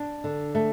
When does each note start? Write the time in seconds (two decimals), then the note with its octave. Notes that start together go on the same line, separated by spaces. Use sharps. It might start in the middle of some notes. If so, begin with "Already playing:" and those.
Already playing: D4
0.24 D3
0.55 A3